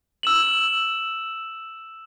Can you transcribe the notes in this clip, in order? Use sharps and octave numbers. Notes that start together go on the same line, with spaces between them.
E6 E7 F#7